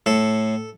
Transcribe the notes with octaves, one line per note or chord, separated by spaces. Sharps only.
A2 A4